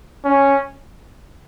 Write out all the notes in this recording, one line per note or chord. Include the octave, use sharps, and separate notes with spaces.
C#4